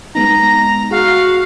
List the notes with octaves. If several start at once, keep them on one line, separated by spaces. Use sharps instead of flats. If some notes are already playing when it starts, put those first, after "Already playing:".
G#3 B3 D#4 A#5 A#6
F#4 G#4 F5